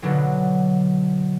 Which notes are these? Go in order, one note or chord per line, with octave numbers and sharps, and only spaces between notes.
B2 D3 F#3